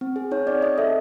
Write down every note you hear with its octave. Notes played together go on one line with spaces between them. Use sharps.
C4
G#4
D#4 C#5
C4 D5
C4 D#5
A4 E5